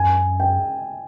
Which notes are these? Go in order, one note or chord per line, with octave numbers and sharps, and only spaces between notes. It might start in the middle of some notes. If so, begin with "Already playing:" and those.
Already playing: F#2 G#5
G5